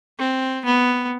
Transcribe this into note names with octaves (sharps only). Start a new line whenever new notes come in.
C4
B3